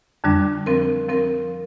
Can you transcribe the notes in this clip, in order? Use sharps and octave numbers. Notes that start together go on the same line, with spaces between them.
F2 D3 G3 D4
F3 C4 A#4
F3 C4 A#4